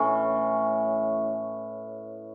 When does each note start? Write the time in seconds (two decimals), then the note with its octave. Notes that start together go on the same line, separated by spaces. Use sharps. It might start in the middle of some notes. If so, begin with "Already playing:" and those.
Already playing: A2 E3 A3 C#4